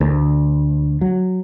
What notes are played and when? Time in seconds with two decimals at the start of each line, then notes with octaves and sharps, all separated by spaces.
0.01 D2
1.01 F#3